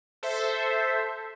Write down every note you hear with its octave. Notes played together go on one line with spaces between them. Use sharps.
A4 C5 E5